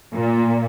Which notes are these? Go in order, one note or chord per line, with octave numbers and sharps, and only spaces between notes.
A#2